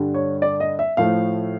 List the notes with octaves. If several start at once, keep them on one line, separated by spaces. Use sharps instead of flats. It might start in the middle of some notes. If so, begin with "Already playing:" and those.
Already playing: G2 D3 G3
C#5
D5
D#5
E5
A2 F3 A3 F5